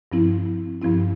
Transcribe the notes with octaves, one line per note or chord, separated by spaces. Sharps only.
G2 F3 C4 E4
G2 F3 C4 E4